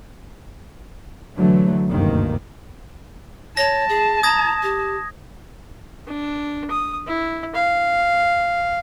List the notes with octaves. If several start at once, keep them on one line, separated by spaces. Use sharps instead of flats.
D3 E3 F#3 A3
F#1 D2 G2 C3 D#3 A#3
C#5 A5 A#6
G#4
A#5 D#6 G#6 A#6
G4
D4
D#6
E4
F5